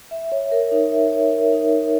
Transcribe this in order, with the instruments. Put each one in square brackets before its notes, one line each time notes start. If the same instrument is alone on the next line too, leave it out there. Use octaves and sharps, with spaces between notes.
[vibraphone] E5
C#5
A#4
D#4
E5
C#5
A#4
D#4
E5